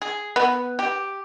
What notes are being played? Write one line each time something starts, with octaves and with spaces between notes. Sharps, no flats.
G#4
B3
G4